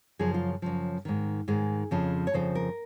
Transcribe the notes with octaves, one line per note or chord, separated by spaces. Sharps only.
F#2 C#3 F3 G#4
F4
F#2 C#3 F3
G#2 D#3
G#2 D#3 G#4
F2 C#3 F3
C#5
F2 C#3 F3 C5
A#4